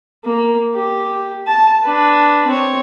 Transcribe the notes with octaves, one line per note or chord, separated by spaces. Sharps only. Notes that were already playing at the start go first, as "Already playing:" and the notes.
A#3
G4
A5
D4 B4
C4 C#5